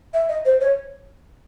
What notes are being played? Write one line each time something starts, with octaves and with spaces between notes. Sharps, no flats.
E5
D#5
C5
C#5